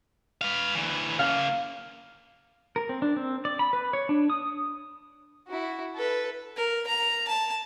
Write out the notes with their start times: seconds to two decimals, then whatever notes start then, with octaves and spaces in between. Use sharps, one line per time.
0.41 B4 F5
0.75 D2 E3
1.19 C#3 A#3 F5
2.76 A#4
2.89 C4
3.02 D4
3.17 C4
3.45 D5
3.59 B5
3.73 B4
3.93 C#5
4.09 D4
4.30 D#6
5.48 E4 F#4
5.95 A4 B4
6.57 A#4
6.87 A#5
7.28 A5